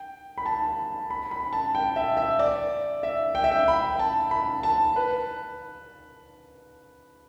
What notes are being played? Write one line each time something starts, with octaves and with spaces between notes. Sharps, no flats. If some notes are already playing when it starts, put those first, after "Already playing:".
Already playing: G5
B5
A5
B5
B5
A5
G5
E5
E5
D5
E5
G5
E5
G5
B5
A5
B5
A5
B4